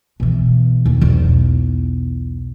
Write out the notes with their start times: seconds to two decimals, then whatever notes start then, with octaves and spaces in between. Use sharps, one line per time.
0.20 B2 E3
0.86 D#2
1.01 B1 E2